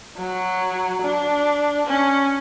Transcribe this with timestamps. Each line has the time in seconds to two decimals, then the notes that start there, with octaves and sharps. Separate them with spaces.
0.17 F#3
1.02 D4
1.87 C#4